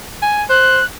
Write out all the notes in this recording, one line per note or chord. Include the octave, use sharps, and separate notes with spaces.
G#5
C5 F#6